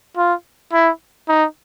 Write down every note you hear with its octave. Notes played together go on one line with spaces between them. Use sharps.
F4
E4
D#4